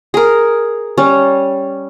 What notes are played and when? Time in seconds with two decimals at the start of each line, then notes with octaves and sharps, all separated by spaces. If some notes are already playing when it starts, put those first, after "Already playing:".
0.14 G#4 A#4
0.98 G3 C#4